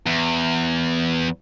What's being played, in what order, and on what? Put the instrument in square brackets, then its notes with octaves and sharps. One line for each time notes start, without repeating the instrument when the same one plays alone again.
[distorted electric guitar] E2